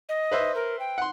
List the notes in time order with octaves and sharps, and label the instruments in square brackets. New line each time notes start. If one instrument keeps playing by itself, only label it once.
[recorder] D#5
[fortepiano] B4 C5 E5
[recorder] A#4
G5
[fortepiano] F#5 C6